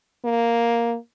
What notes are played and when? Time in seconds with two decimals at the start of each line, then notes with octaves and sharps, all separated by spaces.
0.24 A#3